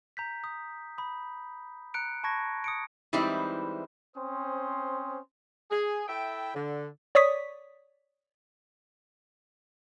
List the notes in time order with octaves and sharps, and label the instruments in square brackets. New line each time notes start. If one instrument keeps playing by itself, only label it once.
[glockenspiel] A#5 G6 B6
D#6
B5 D#6
A#5 F#6 C#7 D7
A5 B5 C#6 G#6 A#6
D#6 C#7 D7
[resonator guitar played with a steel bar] E3 G3 G#3 C4 D#4 E4
[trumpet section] C4 C#4 C5 C6 D#6
[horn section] G#4
E4 A4 E5 G5
D3
[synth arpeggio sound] C#5 D5 C#6 D#6 B6